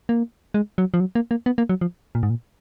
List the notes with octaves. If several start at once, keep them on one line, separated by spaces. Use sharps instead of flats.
A#3
G#3
F#3
F3
F#3
A#3
A#3
B3
A#3
F#3
F3
A#2
G#2
A#2